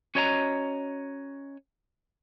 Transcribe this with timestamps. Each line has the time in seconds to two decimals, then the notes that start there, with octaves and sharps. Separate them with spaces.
0.15 C#4 F#4 C#5 D#5 G5 A#5